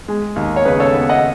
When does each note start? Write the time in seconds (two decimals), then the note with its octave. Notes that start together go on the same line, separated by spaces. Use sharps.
0.08 G#3
0.36 D#2
0.56 C#5
0.65 C#3 G#4 B4
0.80 A4 C#5
0.94 B3
1.09 D#5 F#5